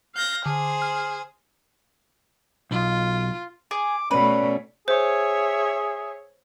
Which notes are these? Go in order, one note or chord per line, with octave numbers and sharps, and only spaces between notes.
F5 G6 A#6
D3 G#4 C5
F6
B1 F4
G#4 D6
B2 A3 C#4 B4 D5
G#4 C5 C#5 E5